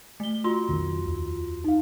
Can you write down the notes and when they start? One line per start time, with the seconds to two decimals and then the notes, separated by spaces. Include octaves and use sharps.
0.20 A3 G7
0.44 F4 F#4 C6
0.68 B1 F2 D#3
1.05 D#2
1.64 D#4 F5